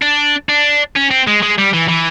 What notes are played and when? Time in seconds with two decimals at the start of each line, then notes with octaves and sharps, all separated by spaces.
0.02 D4
0.49 D4
0.96 C#4
1.11 C4
1.27 G#3
1.43 G#3
1.58 G3
1.74 E3
1.89 E3